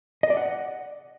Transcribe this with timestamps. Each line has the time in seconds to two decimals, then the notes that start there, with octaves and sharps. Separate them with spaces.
0.23 D#5
0.30 D5
0.37 F#5